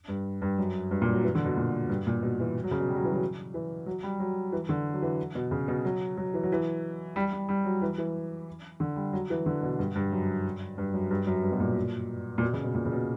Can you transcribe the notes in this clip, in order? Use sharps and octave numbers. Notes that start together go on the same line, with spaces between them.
G2
G2
F#2
G2
A#2
F#3
E3
D3
B2
A#2
G2
A#2
B2
E3
F#3
C#3
B2
G3
F#3
E3
F#3
E3
F#3
G3
F#3
E3
D3
F#3
E3
B2
C#3
B2
F#3
F#3
E3
F#3
E3
G3
G3
G3
F#3
E3
E3
D3
G3
F#3
E3
D3
B2
G2
G2
F#2
G2
F#2
G2
F#2
G2
B2
A#2
A#2
B2
C#3
B2
A#2
C#3
B2